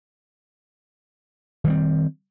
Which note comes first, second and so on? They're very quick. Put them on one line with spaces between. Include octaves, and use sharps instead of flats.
D#3 G3 C4